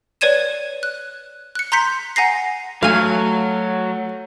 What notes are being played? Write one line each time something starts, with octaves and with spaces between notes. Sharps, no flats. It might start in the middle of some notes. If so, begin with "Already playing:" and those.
B4 C#5 D5 G#6 D#7 E7
F#6
F#6 C#7
A#5 C6 G6 B6 C#7
F#5 G#5 A#5 A#6 C7
F#3 A3 F5 G#5